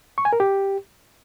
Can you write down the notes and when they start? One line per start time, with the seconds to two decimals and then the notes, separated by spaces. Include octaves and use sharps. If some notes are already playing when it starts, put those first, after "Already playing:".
0.18 C#6
0.25 G#5
0.33 A#4
0.40 G4